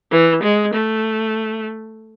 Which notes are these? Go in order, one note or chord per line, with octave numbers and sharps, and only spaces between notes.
E3
G#3
A3